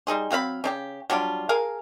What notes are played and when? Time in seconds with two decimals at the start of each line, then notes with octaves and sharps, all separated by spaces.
0.07 G3 D#4 G#4 C6
0.31 F#3 C4 F5 B5
0.64 C#3 D#4 G4
1.10 F#3 G3 D4 F4
1.49 G#4 A#4 F5